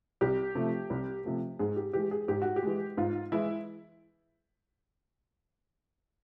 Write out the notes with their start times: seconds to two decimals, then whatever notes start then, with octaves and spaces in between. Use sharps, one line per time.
0.21 C2 G4
0.55 C3 F3 A3
0.90 C2
1.24 C3 F3 A3
1.59 G#2 G#4
1.76 G4
1.93 E3 G#3 G4
2.11 G#4
2.28 G#2 G4
2.42 F#4
2.56 G4
2.63 E3 G#3
2.97 G#2 F4
3.32 E3 G#3 E4